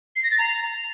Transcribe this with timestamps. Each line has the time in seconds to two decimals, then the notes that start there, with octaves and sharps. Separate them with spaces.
0.16 C7
0.23 A#6
0.31 A6
0.39 A#5